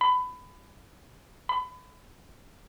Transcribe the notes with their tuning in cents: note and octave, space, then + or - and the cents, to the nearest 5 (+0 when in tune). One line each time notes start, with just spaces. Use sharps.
B5 +20
B5 +30